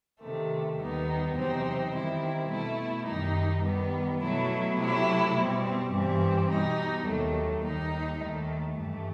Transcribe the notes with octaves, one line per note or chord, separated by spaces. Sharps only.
C3 D#3 A3
D#2 D#3 G3 B3 D#4
E2 C3 F#3 C4 D#4
D#3 G3 C4 E4
B2 A3 E4
F#2 D#3 G3 D#4
D#3 G3 B3
B2 F#3 A3 E4
C3 F#3 A3 E4
B2 G3 C4
G2 E3 G3 C4
B2 G3 D#4
D#2 D#3 F#3 A3
D#2 D#3 G3 D#4
D#2 D#3 A3
G2 E3 A3